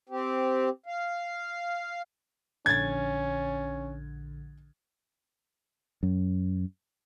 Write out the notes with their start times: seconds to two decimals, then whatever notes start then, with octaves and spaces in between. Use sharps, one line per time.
0.09 C4 G4
0.86 F5
2.66 A#1 D3 C#4 G#6 A6
6.03 F#2